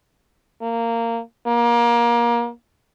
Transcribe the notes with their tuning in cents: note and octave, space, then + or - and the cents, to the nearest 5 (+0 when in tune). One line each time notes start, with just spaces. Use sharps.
A#3 -15
A#3 +25